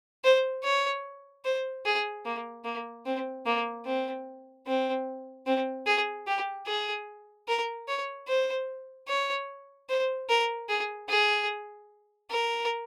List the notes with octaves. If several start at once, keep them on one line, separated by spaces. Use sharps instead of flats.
C5
C#5
C5
G#4
A#3
A#3
C4
A#3
C4
C4
C4
G#4
G4
G#4
A#4
C#5
C5
C#5
C5
A#4
G#4
G#4
A#4